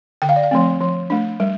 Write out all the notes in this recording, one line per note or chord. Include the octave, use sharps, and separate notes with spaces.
D3 G5
F5
D5
F5
F3 A3 C4
F3
A3 D4
G3